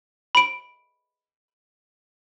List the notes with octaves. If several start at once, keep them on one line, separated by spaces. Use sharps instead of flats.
B5 D7